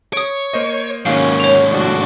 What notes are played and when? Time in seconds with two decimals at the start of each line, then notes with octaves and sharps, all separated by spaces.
0.13 C#5 D#6 D7
0.54 A#3 C5 D#5
1.06 D#2 G#2 D#3 F#3 A#3 C#4 F5
1.40 C#5 F7
1.71 A2 F3 A3 D4 F#4